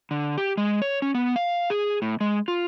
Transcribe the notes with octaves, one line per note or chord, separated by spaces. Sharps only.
D3
G4
G#3
C#5
C#4
B3
F5
G#4
A2
G#3
F4